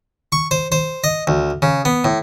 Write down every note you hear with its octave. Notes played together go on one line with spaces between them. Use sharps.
C#6
C5
C5
D#5
D2
C#3
B3
A2